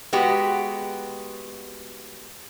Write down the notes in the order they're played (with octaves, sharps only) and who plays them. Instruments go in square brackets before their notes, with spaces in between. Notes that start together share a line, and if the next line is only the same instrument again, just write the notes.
[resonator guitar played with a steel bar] G#3 B3 F#4 G4